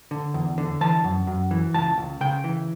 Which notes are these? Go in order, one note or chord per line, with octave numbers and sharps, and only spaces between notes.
D3
E2
D3
E3 A5
F#2
F#2
E3
C#2 A5
C#2
C#3 G5
E3